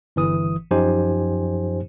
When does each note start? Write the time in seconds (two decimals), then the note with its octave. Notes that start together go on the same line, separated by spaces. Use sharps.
0.16 G1 E3 D#6
0.71 F#2 F3 D#4 G4 C5 G#5